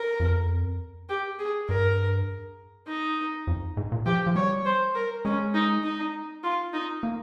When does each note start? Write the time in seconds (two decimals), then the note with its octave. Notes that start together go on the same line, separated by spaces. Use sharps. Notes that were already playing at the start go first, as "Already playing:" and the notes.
Already playing: A#4
0.20 F2
1.09 G4
1.39 G#4
1.69 G2 A#4
2.87 D#4
3.47 F2
3.77 G#2
3.92 A#2
4.06 F3 G4
4.27 F3
4.36 G3 C#5
4.65 C5
4.95 A#4
5.25 G#3 C#4
5.54 D#4
5.83 D#4
6.43 F4
6.73 D#4
7.03 A#3